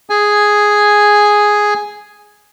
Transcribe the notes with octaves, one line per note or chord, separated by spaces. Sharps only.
G#4 G#5